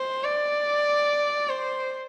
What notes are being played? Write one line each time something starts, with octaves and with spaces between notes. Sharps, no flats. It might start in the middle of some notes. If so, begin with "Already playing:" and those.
Already playing: C5
D5
C5